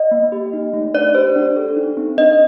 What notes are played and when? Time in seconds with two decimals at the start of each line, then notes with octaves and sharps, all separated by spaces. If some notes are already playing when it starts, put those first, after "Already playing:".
Already playing: D#5
0.11 A#3
0.32 G4
0.53 D#4
0.73 A3
0.94 D4 D5
1.15 G4 C5
1.36 D4
1.56 A4
1.77 D#4
1.97 C4
2.17 D4 D#5